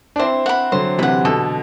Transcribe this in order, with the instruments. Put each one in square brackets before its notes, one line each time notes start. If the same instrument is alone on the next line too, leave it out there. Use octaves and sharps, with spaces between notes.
[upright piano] D4
[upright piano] C4 E4 [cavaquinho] C5
[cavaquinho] F#5 B5
[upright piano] D3 F#3 [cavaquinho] C5
[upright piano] C3 E3 [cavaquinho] F#5 B5
[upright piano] B2 D3 [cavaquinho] A4